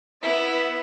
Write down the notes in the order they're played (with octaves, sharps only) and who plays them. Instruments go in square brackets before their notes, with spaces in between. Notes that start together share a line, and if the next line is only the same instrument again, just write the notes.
[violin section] B3 E5 [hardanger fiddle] E4